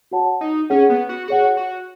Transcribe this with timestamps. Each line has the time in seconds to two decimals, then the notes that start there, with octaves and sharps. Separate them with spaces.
0.11 F#4 C#5 F#5 A5
0.41 D#4
0.70 C#4 G#4 C#5 F#5
0.90 B3
1.09 F#4
1.28 F#4 G#4 C#5 F#5
1.57 F#4